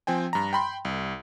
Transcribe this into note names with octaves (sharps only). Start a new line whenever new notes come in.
F3 C4 G5 G#5
G2 A#5
G5 B5 C6
C2